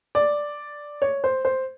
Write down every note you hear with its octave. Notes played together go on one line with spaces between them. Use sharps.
D5
C#5
C5
C5